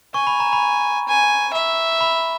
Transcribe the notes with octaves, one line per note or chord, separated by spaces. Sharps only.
G#5 C#6
B5
A#5
B5
G#5
E5 B5
B5